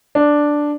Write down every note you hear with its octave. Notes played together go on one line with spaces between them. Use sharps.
D4